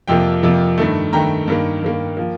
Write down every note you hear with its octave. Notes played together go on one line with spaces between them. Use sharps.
F2 C3 F3 A#3 G5
F2 C3 F3 A#3
G2 D#3 A3
G2 D#3 A3 G5 A#5
G2 D#3 A#3
G2 D#3 A#3
F3 A#3